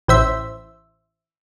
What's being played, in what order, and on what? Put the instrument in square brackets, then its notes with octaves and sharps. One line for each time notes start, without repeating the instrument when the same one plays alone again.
[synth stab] A1 C5 E5